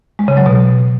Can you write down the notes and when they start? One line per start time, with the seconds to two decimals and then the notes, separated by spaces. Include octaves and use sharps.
0.19 G#3
0.28 C#3
0.37 F#3
0.46 B2